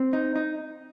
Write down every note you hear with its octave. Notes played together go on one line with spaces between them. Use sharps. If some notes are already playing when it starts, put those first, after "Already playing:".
Already playing: C4
D#4
D#4